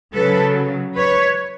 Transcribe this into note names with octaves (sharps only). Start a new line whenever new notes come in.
C#3 F#3 A4 B4
B4 C#5